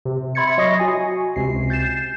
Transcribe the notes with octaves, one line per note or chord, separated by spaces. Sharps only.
C3
E5 B5 C6 G#6 A6 C#7
F#3 D#5 C#6 D#6 A#6 C7
F#4 G#5
C#2 C3 C7
G6 A6 C7 E7